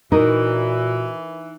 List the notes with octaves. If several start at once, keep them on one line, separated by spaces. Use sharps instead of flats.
A#2 E3 D#4 F#4 A#4